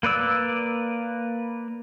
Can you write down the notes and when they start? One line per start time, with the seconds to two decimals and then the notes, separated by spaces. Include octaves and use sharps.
0.03 A#3 B4 D5 E6